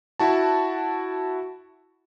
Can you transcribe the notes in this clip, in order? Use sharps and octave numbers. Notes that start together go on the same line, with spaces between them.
E4 F#4 A5